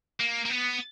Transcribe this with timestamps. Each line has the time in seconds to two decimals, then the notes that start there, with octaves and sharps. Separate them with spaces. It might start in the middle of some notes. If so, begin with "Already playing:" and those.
0.20 A#3
0.45 A#3
0.50 B3